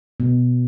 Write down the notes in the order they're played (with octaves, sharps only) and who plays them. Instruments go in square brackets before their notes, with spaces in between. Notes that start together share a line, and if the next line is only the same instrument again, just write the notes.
[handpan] B2